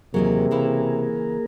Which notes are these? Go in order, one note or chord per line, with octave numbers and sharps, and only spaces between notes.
D#2 C3 E3 F#3 A#3 G#4 A#4
C#3 E3 E4